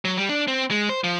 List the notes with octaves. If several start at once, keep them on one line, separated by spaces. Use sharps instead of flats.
F#3
G3
D4
C4
G#3
C5
F3